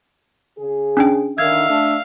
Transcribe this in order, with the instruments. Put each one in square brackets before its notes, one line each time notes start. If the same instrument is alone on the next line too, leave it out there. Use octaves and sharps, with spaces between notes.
[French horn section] C#3 G#4
[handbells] C#4 D4 G5
[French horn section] D3 D#3 [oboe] E5 [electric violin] F5 [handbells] G#6
[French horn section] A3 D4